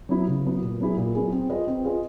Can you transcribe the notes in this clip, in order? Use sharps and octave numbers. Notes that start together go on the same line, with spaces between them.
F#3 B3 E4
C#3
F#3 B3 E4
A#2
F#3 B3 E4 G#4
A#2
F#3 B3 E4 G#4
C4
F4 G#4 B4 D#5
C4
F4 G#4 B4 D#5